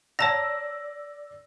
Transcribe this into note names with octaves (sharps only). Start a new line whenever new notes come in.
C#5 D5 A5 A#5 E6 A#6